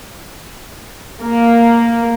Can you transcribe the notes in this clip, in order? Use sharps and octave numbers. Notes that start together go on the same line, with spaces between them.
A#3